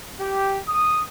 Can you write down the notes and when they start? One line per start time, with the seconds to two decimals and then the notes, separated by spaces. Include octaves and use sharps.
0.20 G4
0.68 D#6